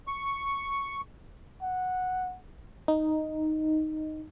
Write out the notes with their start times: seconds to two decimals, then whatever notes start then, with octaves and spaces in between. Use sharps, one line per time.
0.07 C#6
1.62 F#5
2.88 D#4